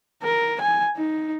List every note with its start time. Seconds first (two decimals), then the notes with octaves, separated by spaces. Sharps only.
0.22 A#4
0.61 G#5
0.96 D#4